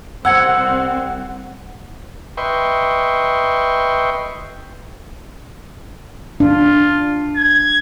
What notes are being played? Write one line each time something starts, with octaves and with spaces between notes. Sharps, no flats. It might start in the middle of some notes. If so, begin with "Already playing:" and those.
C2 C4 F#5 E6 G#6 C#7
B4 D#5 E5 G5 C6 C#6
D4 F4
G#6